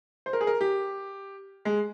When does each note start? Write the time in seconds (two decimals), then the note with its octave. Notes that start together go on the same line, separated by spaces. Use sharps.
0.26 C5
0.33 A#4
0.41 G#4
0.47 A#4
0.61 G4
1.65 G#3